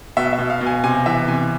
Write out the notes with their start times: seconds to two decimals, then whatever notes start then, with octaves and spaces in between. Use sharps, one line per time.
0.17 B2 E5
0.33 E5
0.39 B2
0.50 F5
0.61 B2
0.67 G#5
0.84 C3 G#5
1.06 E3 E5
1.28 C3 G#5